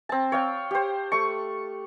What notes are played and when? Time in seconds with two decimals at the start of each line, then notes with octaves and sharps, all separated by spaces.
0.09 C4 A5
0.32 C#5 F5 G5
0.71 G4 C5
1.12 A3 C#6